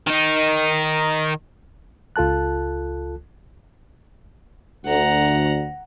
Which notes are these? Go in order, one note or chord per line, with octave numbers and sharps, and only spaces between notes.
D#3 D#4
C#2 F4 A4 A5 F#6
D2 F#5 A#5